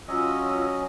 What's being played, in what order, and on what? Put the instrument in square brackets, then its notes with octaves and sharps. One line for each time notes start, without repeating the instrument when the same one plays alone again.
[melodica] F#3 C#4 D#5 [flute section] F4 E6